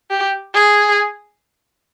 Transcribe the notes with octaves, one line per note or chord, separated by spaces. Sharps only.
G4
G#4